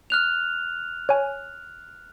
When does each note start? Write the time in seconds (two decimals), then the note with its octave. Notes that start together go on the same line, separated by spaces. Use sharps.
0.10 F6 F#6 F7
1.09 C#5 G#5